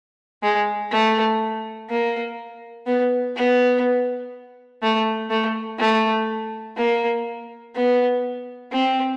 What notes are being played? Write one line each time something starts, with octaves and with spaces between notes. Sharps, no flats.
G#3
A3
A#3
B3
B3
A3
A3
A3
A#3
B3
C4